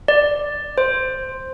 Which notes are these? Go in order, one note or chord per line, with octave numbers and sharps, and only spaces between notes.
D5
C5